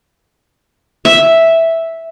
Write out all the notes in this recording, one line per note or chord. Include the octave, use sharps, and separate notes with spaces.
E5